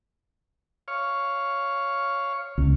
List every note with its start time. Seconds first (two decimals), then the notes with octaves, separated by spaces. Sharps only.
0.88 C#5 F5
2.58 C#2